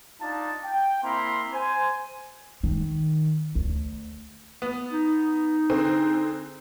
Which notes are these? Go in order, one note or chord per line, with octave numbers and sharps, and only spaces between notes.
D4 D#4 F4 A5
G5
A#3 C4 E4 A#5 C6
C5 G#5
D#3
D2
B3
D#4
D3 C4 G#4